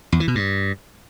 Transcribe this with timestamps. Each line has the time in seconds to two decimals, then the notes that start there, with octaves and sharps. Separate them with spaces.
0.12 E2
0.20 E3
0.28 B2
0.35 G2